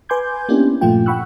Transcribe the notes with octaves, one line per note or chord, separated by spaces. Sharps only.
B4 G#5 C6 D6 G6 G#6
A#3 B3 C#4 D4 E4 G4
G2 A#2 F3 A3 F4 G5
F#5 G5 B5 C#6 E6 F#6